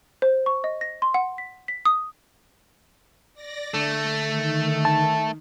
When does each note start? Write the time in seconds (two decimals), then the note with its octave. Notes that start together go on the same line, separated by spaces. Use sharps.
0.22 C5
0.46 C#6
0.64 D#5
0.81 A#6
1.02 C6
1.14 F#5
1.38 B6
1.68 B6
1.85 D#6
3.34 D5 A#6
3.74 D3 A3 A#6
4.24 D#3
4.85 A5